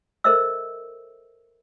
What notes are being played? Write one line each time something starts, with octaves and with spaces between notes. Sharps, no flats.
A4 A#4 C5 D#5 E5 E6